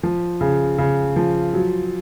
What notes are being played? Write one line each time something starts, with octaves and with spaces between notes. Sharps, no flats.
F3
C#3
C#3
F3
F#3